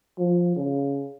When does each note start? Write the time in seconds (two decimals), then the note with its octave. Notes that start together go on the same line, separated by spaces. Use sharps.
0.18 F3
0.56 C#3